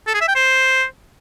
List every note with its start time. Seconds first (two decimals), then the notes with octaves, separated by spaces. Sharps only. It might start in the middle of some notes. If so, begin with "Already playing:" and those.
0.07 A4
0.14 G#4
0.21 E5
0.28 G5
0.35 C5